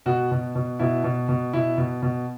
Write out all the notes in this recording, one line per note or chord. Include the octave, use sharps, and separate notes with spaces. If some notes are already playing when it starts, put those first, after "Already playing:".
B2 F#4
B2
B2
B2 E4
B2
B2
B2 E4
B2
B2